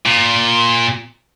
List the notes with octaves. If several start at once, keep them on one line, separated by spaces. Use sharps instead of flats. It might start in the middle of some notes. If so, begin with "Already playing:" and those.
A#2